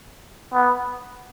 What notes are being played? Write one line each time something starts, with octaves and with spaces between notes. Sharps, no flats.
B3